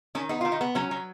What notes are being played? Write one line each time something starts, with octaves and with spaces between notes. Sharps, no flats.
D#3 C#4
B3 D#4
D#3 F4
D#4
B3
F#3 C#4
F#3